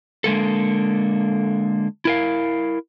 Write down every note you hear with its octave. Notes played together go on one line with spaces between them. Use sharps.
D3 G#3 A#3 A4
E4 A#4 F5